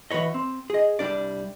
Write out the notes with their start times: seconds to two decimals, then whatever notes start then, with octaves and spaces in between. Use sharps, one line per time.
0.11 E3 F#4 B4 C#5 D#5
0.34 C4
0.70 G#4 D#5
0.99 C2 G3 D4 D5